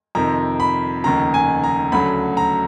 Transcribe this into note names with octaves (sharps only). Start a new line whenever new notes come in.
F2 C3 D#3 A#5
B5
F1 D#2 C#3 A#5
G#5
A#5
D2 C#3 F#3 A3 B5
A#5